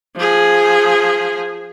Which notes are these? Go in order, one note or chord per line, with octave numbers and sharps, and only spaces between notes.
F3 G#4